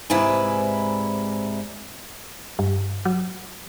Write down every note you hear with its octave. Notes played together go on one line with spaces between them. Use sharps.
G#2 C3 E4 B4 D5 G#5
G2
F#3